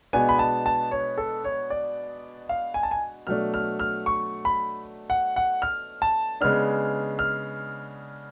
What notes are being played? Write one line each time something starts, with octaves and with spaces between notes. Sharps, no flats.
B2 G#3 B3 D4 G#5
B5
A5
A5
C#5
A4
C#5
D5
F5
G#5
A5
G#5
B2 F#3 A3 D4 F6
F6
F6
C#6
B5
F#5
F#5
F6
A5
C#3 G#3 B3 D4 F6
F6